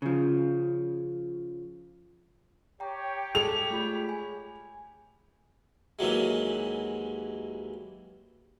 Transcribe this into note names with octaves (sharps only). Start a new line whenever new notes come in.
C#3 F3
G4 C#5 G5 A#5
G#3 G#4 A4 F7
A3 F4 B5
G#5
D#2 E3 F#3 G#3